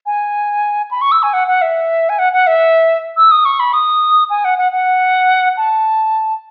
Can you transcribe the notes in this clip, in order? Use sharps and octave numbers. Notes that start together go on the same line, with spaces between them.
G#5
B5
C#6
E6
G#5
F#5
F#5
E5
G#5
F#5
F#5
E5
E6
D#6
C#6
B5
D#6
G#5
F#5
F#5
F#5
A5